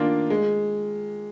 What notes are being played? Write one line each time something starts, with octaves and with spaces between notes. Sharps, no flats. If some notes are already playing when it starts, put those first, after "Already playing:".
Already playing: D#3 A#3 D4 F4
G#3